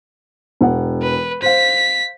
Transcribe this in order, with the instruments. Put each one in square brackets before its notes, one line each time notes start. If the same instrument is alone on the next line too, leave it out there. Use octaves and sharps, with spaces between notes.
[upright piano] E1 F#5
[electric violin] B4
[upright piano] C5 F5 [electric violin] B6